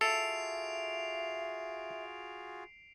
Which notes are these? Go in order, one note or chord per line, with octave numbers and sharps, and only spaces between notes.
F4 F#4 G#4 A4 E5 C7 D7 F7